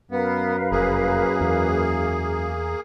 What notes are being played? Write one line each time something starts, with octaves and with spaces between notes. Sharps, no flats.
F#2 B3 A#4 B4 F5
F1 A#3 G#4
E2